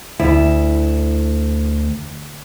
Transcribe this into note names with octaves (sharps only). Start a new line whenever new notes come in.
D2 E4